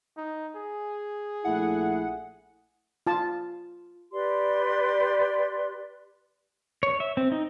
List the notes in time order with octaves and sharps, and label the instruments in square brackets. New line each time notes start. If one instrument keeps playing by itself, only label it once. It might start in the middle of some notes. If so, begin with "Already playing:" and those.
[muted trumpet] D#4
G#4
[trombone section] A#1 A3 E4 [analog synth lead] F#5
[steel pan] F4 A5
[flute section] G4 B4 D5 C6
[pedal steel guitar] C#5
E5
C4
D#4